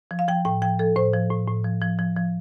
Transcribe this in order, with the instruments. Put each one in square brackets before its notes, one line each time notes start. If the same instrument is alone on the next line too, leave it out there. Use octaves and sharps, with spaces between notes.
[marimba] F3
F5
F3 G5
A2 G5
F3 G5
F3 A4
A2 C5
F3
A2
A2
F3
F3
F3
F3